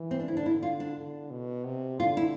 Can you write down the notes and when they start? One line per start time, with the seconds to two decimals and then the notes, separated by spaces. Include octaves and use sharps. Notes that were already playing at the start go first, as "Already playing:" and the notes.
Already playing: E3
0.11 C4
0.20 D4
0.28 D3 E4
0.37 D4
0.46 E4
0.63 F4
0.80 D4
0.97 D3
1.31 B2
1.65 C3
1.99 D3 F4
2.17 E4